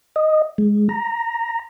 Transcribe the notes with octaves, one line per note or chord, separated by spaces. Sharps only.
D#5
G#3
A#5